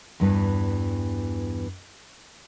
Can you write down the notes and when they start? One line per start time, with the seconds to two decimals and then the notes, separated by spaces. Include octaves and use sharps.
0.20 E2 G2 E3